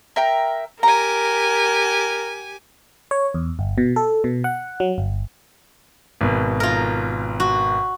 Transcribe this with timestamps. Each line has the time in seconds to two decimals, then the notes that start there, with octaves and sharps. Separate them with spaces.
0.16 A#4 E5 G5
0.83 G4 A#4 G#5 A#5
3.11 C#5
3.34 E2
3.59 G1
3.78 B2
3.96 A4
4.24 B2
4.44 F#5
4.80 F#3
4.98 G1
6.21 G#1 B2
6.60 F4 A#4
7.40 F#4